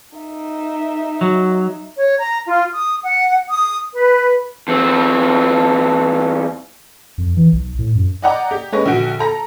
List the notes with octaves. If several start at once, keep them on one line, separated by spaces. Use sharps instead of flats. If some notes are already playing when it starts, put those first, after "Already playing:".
D#4 E5
F#3
C#5
A#5
F4
D#6
F#5
D#6
B4
E2 C4
F2
E3
B1
A2
F#2
D5 D#5 F#5 G5 A#5 D6
G4
G#3 C#4 B4 C#6 A#6
A#1 D3 F#4 D7
A4 A#5 A#6